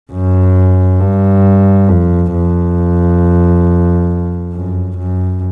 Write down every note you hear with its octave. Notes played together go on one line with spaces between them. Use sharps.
F#2
G2
F2
F2
F#2
F#2